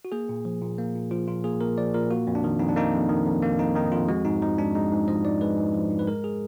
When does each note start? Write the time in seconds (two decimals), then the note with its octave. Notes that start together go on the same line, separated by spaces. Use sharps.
0.05 F#4
0.12 A#3 G#4
0.29 A#2
0.45 F3
0.62 A#2
0.78 A#3
0.95 A#2
1.11 F3 F4
1.28 A#2 F4
1.44 A#3 G#4
1.61 A#2 A#4
1.78 F3 D5
1.94 A#2 A#4
2.10 A#3 F#4
2.27 F2
2.35 D4
2.44 D#3
2.60 F2 D#4
2.69 D4
2.76 A#3 D#4
2.93 F2
3.09 D#3
3.26 F2
3.42 A#3
3.59 F2 D#4
3.75 D#3 D#4
3.92 F2 F4
4.09 G#3 F#4
4.25 G#2 D#4
4.42 F3 D#4
4.58 G#2 D4
4.75 G#3 D#4
4.92 G#2
5.08 F3 D#5
5.25 G#2 D5
5.41 G#3 B4
5.57 G#2
5.74 F3
5.91 G#2
5.99 B4
6.08 G#3 A#4
6.24 G#4